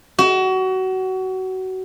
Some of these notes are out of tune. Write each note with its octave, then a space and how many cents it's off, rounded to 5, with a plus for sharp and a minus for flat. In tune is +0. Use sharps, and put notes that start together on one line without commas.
F#4 +25